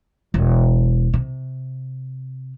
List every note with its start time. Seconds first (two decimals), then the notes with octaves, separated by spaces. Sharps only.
0.34 E1
1.14 C3